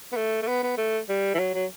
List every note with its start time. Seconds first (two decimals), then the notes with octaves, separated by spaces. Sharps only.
0.12 B3
0.16 A3
0.42 A3
0.47 B3
0.63 B3
0.77 A3
1.09 G3
1.34 E3
1.39 F#3
1.55 F#3